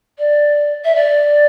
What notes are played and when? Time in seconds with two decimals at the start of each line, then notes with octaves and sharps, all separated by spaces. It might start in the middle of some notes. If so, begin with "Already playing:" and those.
0.18 D5
0.84 E5
0.95 D5